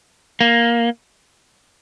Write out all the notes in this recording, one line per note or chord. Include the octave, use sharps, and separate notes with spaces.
A#3